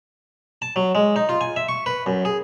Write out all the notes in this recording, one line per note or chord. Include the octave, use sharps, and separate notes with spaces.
A5
F#3
G#3
D#4
F4
G#5
E5
C#6
B4
F#2
G#4